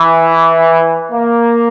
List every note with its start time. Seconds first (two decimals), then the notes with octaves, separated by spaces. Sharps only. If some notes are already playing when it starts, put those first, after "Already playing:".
Already playing: E3
1.12 A#3